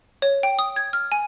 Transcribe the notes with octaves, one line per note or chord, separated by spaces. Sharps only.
C#5
G5
D#6
G#6
F6
G#5